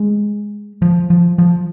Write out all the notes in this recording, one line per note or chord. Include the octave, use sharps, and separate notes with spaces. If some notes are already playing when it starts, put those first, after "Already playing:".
Already playing: G#3
F3
F3
F3